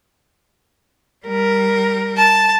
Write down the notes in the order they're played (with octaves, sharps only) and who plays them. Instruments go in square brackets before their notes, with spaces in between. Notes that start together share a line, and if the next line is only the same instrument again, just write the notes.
[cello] G3 A#4
[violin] A5